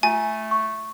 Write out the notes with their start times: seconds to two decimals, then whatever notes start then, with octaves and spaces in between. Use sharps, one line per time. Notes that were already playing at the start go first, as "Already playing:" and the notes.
0.03 A3 F4 G#5
0.51 C#6